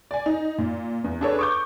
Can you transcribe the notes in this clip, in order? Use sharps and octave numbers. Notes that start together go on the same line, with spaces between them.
D5 G#5
D#4
A#2
E2
D4 G#4 A4 B4 C#5
C#6 D6 G6